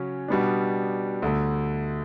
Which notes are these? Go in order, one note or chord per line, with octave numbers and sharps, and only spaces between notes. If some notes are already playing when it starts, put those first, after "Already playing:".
Already playing: C#3 F#3 C#4
B2 G3 B3 D4
D2 D3 A3